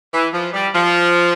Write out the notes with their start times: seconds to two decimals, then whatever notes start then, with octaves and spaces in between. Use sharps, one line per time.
0.13 E3
0.33 F3
0.53 G3
0.73 F3